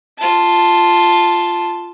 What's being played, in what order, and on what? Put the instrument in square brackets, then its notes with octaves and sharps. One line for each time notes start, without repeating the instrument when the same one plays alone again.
[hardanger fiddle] F4 A5